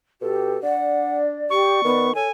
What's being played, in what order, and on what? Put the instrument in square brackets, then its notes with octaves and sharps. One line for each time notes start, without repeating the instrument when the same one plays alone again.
[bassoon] B2 [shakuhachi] G4 [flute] A4
[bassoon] D4 [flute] D5 [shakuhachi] F#5
[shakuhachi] G4 [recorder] C#6
[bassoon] D#3 [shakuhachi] B3
[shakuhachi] A4 [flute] C#5 [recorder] G#5